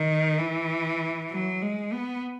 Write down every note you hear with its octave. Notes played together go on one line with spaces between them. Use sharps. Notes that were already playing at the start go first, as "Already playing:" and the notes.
Already playing: D#3
E3
F#3
G#3
B3